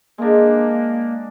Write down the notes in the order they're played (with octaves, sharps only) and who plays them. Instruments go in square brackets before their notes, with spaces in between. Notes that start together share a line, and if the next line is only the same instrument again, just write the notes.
[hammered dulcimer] G#3 D4 [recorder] A#3